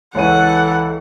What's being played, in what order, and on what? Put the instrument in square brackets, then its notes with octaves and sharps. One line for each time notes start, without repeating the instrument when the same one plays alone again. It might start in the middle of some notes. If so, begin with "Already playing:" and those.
[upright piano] C#2 C#5 D#7 [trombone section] E3 [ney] A4 [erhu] F#5